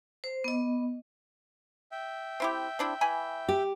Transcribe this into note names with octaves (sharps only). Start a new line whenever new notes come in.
C5
B3 D#5
E5 G5
C4 E4 G4
C4 D4 E4
E3 G#5 B5
G4